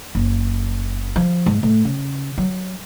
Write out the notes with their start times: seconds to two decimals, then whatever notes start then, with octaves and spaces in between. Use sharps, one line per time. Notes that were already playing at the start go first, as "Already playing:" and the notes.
0.15 F#1
1.16 F3
1.46 G#2
1.63 A2
1.85 C#3
2.38 F#3